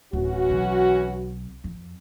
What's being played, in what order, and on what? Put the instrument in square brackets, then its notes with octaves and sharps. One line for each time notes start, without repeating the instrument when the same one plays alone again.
[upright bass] D1 [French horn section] E3 C#4 F#4
[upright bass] B1 C4
F2